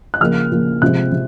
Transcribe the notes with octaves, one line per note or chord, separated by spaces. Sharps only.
F#6
C#3 F3 A#3 F6
C#3 F3 A#3
C3 F3 G#3 C4 F#6
C3